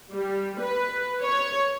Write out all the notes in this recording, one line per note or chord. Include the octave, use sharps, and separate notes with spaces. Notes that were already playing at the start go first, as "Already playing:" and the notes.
G3
B4
C#5